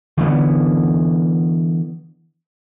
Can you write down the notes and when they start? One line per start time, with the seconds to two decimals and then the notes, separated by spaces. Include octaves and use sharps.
0.18 D3 E3 G3 B3